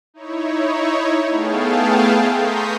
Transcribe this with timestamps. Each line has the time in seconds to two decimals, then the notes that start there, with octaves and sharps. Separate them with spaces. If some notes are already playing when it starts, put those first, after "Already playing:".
0.14 D#4 E4 C#5
1.29 A3 B3 G#4 F5 G5 A5
2.26 A#5 C6 C#6 D#6 G6 B6